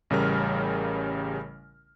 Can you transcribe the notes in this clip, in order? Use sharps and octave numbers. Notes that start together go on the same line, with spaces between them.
A1 C#3 G3 A#4 F6